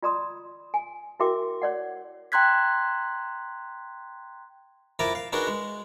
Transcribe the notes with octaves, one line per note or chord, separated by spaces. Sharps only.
F4 D5 A#5 C6 D#6
G#5
E4 F#4 A#4 E5 G5 D6
C#5 D5 F#5
G5 A#5 C6 F#6 G#6 B6
F2 E4 A#4 A5 A#5 D6
F5
B3 D4 D#4 F#4 G#4 A#4
G#3